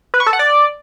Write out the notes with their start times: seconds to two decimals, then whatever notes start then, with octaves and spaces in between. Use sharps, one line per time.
0.14 B4
0.20 C#6
0.26 A4
0.33 F#5
0.39 D5